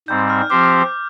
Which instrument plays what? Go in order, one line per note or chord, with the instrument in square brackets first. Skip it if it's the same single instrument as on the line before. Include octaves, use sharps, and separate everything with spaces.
[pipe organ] G#2 G3 C4 [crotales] G6
[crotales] F6
[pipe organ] F3 C4 G4 C5 [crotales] D6